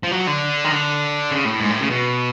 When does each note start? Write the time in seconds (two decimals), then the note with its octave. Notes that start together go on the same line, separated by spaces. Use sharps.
0.03 F3
0.12 F#3
0.27 D3
0.64 D#3
0.72 D3
1.31 C#3
1.45 A2
1.60 G#2
1.70 A2
1.80 C#3
1.90 B2